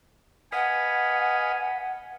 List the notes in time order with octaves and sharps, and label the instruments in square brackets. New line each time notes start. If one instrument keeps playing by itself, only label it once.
[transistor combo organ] B4 D#5 F5 [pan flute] F#5 [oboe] G#5